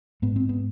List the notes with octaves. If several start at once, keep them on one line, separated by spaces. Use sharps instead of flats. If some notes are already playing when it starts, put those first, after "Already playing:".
G#2 B3
C4
B3